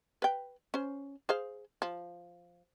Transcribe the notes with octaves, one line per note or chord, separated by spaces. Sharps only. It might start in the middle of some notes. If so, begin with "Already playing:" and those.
B4 G5
C#4 C5
G#4 C5 F5
F3